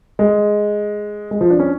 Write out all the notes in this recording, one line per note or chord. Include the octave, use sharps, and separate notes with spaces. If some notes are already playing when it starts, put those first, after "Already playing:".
G#3
G#3
F3
D4
C#4